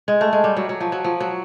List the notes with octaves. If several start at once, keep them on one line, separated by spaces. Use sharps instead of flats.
G#3
A3
G#3
G3
F#3
F#3
F3
F#3
F3
F#3